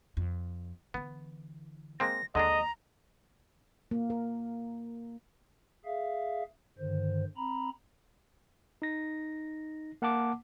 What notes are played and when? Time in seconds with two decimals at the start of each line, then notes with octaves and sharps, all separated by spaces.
0.17 F2
0.94 D3 E3 B3
2.00 G#3 A#3 C4 A#6
2.35 D#2 D3 G#3 D4 D#5 A#5
3.91 A#3
4.10 A#4
5.85 G#4 E5 F5
6.78 G2 D3 D#3 C5
7.36 C4 A#5 B5
8.82 D#4 A#6
10.02 A#3 F#5 A5 D6